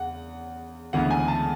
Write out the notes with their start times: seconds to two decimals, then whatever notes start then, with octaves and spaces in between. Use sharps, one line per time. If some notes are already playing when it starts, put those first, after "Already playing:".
Already playing: E2 C#3 F#5
0.93 D2 C#3 E3 G#3 B3 F#5
1.10 G#5
1.28 A5